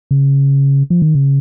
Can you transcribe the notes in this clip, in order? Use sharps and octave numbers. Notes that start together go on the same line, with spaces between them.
C#3
F3
D#3
C#3